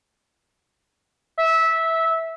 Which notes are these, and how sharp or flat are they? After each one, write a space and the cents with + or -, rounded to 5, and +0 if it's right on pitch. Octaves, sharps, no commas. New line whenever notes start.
E5 -15